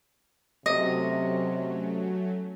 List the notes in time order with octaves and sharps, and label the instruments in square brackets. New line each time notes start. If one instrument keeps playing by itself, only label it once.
[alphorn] C3 [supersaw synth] F#3 A3 C#4 [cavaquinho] D#5